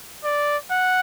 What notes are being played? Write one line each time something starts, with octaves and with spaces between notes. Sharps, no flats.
D5
F#5